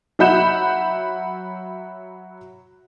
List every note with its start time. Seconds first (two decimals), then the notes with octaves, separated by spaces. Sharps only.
0.19 F#3 E5 F#5 B5 G6 E7